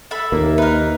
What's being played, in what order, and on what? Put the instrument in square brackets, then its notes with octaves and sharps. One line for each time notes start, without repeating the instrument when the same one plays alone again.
[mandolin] A4 E5 B5
[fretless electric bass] D#2 [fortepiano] A#3
[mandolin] D#4 A#4 [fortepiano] B4